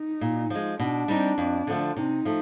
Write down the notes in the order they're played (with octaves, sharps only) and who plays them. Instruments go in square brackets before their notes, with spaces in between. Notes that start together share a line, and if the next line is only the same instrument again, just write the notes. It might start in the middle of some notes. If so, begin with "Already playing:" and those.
Already playing: [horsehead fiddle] D#4
[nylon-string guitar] A#2
F3 G#3
[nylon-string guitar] B2 [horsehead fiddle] D4
[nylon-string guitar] G3 C4 D#4
F2
D3 F3 A3
[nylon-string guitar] C3 [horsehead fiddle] D#4
[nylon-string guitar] F3 A3